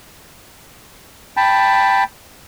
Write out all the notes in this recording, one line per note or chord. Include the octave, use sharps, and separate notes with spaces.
G5 A5 B5